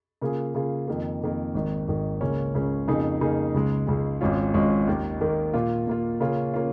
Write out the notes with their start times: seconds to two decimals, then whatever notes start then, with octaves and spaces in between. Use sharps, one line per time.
0.22 C#3 A#3 F4 G#4
0.55 C#3 A#3 F4 G#4
0.88 F2 D#3 A#3
1.21 F2 D#3 A#3
1.54 G#1 G#2 D#3
1.88 G#1 G#2 D#3
2.21 C#2 C#3 A#3 C#4
2.54 C#2 C#3 A#3 C#4
2.88 F2 C#3 A#3 D#4 G#4
3.21 F2 C#3 A#3 D#4 G#4
3.54 C#2 C#3 G#3
3.87 C#2 C#3 G#3
4.21 G#1 G#2 G#3 C#4 F4
4.54 G#1 G#2 G#3 C#4 F4
4.88 D#2 D#3 A#3
5.20 D#2 D#3 A#3
5.54 A#2 A#3 F4
5.87 A#2 A#3 F4
6.20 C#3 A#3 C#4 F4
6.54 A#3 C#4 F4